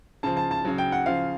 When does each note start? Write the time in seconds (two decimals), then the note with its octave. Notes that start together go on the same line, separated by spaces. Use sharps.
0.23 C#3 F3 A5
0.37 A5
0.51 A5
0.65 C#3 F#3
0.78 G5
0.92 F#5
1.06 C#3 F3 F5